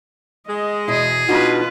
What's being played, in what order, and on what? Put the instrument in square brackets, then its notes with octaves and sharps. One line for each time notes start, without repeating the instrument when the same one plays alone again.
[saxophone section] G#3 [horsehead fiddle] D#5
[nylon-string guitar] E2 B2 E4 [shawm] G#4
[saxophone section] B2 [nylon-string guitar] D4 D#4 F#4 [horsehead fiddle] F4 B4